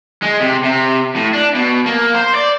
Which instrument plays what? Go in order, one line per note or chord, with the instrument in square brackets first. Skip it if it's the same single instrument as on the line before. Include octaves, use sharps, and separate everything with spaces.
[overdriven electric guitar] G#3
C3
C3
A2
D4
B2
A#3
C5
D5